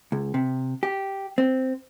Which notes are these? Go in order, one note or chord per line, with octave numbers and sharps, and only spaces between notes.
C#2
C3
G4
C4